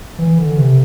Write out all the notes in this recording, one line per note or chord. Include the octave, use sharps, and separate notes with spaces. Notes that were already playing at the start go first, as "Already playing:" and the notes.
E3
D3
C3